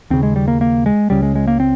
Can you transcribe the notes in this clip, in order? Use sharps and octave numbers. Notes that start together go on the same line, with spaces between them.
D#2 C#3 C4
G#3
G3
A#3
A#3
G#3
C#2 C#3 G3
G#3
G#3
A#3
C4